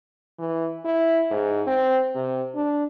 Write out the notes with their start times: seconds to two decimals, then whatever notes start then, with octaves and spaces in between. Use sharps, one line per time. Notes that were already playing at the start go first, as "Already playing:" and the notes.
0.39 E3
0.85 E4
1.31 G#2
1.67 C4
2.15 C3
2.55 D4